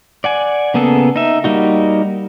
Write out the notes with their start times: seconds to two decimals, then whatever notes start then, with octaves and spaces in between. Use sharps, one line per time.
0.24 D5 F#5 G#5
0.74 C#3 A#3 B3 G#4 A4
1.16 D#4 E5
1.44 G3 A#3 D#4 F#4